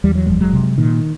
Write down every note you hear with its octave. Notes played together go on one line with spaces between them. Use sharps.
E2 G3
F#3
F#1 F3 G3
F#3 G#3
C3
A#2 D#3